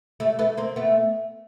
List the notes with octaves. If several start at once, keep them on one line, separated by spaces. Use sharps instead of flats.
G3 A3
A3 B3
A#3 C4
A3 B3